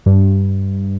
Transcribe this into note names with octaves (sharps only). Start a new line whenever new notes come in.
G2